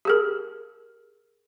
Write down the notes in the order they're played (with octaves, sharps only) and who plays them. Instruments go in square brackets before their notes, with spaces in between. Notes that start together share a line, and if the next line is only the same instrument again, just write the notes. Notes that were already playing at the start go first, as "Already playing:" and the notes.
[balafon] G4 G#4 A#4